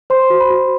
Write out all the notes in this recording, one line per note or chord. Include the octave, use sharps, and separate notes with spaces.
C5 C6
F#4
B5
F#4